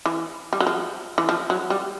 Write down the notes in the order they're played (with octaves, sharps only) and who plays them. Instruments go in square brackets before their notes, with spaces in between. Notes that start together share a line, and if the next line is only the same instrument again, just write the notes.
[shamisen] E3
G3
F#3
F3
E3
F3
F#3
G3